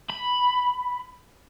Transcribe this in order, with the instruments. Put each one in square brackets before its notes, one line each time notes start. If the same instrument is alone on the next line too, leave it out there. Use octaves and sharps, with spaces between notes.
[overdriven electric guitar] B5